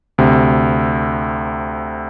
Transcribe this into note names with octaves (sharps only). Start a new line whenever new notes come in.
D2 C3